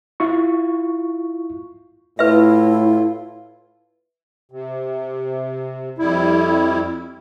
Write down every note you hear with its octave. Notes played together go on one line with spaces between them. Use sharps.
E4 F4 C#6
A2 E4 F4 B4 E5
C3
F2 G3 E4